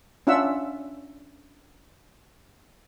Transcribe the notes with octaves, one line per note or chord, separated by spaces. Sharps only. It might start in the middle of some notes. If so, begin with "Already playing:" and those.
C#4 D4 F4 E5 F#5 E6